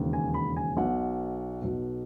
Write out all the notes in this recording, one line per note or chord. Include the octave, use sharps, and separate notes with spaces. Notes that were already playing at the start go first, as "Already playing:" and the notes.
Already playing: E1 D#2 C#3
G#5
B5
G#5
B1 B2 F#5
B1 B2